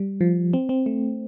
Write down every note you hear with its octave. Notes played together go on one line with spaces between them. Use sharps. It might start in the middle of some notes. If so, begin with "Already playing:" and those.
Already playing: G3
F3
C4
C4
A3